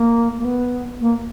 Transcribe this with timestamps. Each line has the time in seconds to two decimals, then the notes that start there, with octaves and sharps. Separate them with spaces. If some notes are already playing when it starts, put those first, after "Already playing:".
Already playing: A#3
0.38 A#3
0.45 B3
1.01 A#3